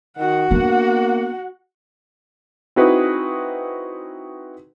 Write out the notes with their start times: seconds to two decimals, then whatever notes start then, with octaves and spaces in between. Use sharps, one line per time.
0.17 D#3 F#4 F#5
0.51 A#3 B3 D4
2.76 C4 D#4 E4 F#4 G#4 B4